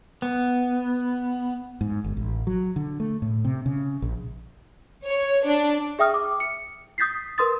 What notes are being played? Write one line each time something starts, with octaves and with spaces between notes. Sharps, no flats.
B3
G#2
G1
A1
F#3
D3
A3
A2
C3
C#3
A#1
C#5
D4
G#4 E5 G5 D#6 F6
D6
C#7
D#6 G6 A6 B6 C7
A#4 B4 C6 D#6 A6